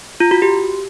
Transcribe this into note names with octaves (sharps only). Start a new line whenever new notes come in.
F4
F#4
G4